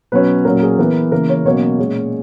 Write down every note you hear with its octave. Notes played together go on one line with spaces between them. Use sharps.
B2 F#3 C#4 B4
A#2 F#3 C#4 A#4
G#4
E3 B3 A#4
C#3 E3 A#3 A#4
C#5
B2 F#3 A#3 C#4 C#5
A#2 G#3 C#4